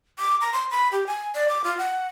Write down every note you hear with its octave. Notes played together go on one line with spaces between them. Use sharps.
D6
A#5
C6
B5
G4
G#5
D5
D6
F4
F#5